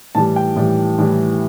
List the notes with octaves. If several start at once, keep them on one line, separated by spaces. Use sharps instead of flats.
A2 E3 G3 A5
G5
A2 E3 G3
A2 E3 G3